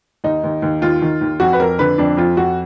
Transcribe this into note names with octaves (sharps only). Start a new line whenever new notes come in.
D#2 D#4
D#2
D#2
D#2 F4
D#3
D#2
F2 F#4
B4
F2 A#4
D3 B4
F2 D4
F2 F4
F2 F#4